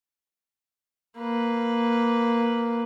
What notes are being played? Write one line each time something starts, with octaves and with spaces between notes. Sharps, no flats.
A#3 B4